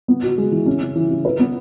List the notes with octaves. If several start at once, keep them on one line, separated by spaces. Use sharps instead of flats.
B3
F#4
G#3
E3
C#4
C#3
E3
C#3
B4
B3